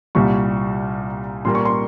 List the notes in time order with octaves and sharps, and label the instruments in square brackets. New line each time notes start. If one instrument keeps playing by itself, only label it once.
[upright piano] C2 A#2 G3 C#6
A#2 G3 A#3 C6
C#6
C6